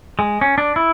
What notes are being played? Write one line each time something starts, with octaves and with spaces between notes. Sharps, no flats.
G#3
C#4
D4
E4